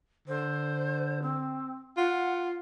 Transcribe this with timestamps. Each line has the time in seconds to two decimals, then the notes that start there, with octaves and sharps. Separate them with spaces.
0.27 D3 C5
1.22 C4
1.97 F4 F#5